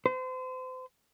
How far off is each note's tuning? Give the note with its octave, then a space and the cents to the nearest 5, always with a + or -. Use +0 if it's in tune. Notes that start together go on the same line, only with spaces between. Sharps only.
C5 -35